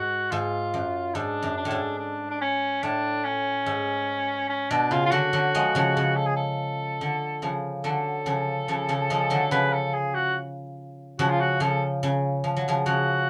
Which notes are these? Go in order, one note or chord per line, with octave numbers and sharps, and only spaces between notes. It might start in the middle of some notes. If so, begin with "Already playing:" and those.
Already playing: G#2 F#4
G#2 F4
F#2
G#2 D4
F#2
D4
A2
G#2
D4
D4
C#4
A2 D4
C#4
G#2
C#4
B2 D4
C#3 F4
F4
D3 F#3 F#4
D3 F#3
F3 G#3
C#3 F3
C#3
A4
G#4
A4
D3
C#3 F3
D3 F#3 A4
C#3 F3
C#3 F3
C#3 F3
F3 G#3
D3 F#3
C#3 F3 B4
A4
G#4
F#4
C#3 F3 F#4
F4
F#4
C#3 F3 A4
C#3
F3
F#3
C#3 F3
C#3 F3 F#4